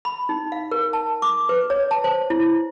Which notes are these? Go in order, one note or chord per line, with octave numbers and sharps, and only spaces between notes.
B5
D#4
F5
A#4
A5
D6
B4
C#5
A5
C5
E4